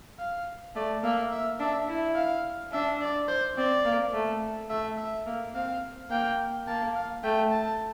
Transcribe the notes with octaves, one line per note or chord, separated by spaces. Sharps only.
F5
A3 D5
A#3 E5
E5
D4 E5
E4
F5
D4 E5
D5
C5
C4 D5
A#3
A3
A3 E5
E5
A#3
C4 F5
A#3 G5
A#3 A5
F5
A3 G5
A5